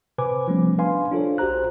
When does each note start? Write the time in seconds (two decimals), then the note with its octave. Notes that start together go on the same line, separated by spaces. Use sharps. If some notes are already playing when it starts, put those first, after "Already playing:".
0.18 C3 B4 C5 G#5 D6
0.48 F3 G3 A3 B3 C#4
0.78 D4 B4 F5 G#5 C6
1.12 D4 F4 A4 C5 C#5
1.38 B1 F#4 G4 C5 A#5 F#6